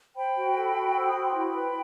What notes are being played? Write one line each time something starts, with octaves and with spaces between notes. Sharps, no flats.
C5 G5 B5
F#4
A4
F#4
C5 E6
D#6
F#4
C6
E4 G5 B5
B4